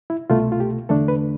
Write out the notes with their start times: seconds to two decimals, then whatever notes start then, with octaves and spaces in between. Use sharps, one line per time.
0.10 E4
0.30 C2 B2 A3 F4
0.52 F4
0.60 G4
0.89 E2 D3 A3 D4 A4
1.08 B4